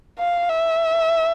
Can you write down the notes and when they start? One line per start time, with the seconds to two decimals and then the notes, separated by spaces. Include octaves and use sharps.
0.19 F5
0.49 E5